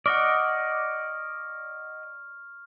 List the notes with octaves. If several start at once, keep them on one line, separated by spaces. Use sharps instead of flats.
D5 D#5 F#5 C#6 F6